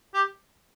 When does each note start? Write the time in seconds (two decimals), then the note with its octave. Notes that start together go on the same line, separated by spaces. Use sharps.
0.14 G4